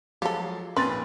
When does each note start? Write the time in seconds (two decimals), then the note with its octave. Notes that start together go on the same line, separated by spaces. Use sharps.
0.22 F3 F#3 G#3 F4 G4 A4
0.77 B1 F2 A#2 C4 C#4 B4 C6 A6